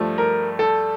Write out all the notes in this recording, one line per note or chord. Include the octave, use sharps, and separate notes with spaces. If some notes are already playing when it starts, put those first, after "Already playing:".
Already playing: G2 F3 A3
A#4
A4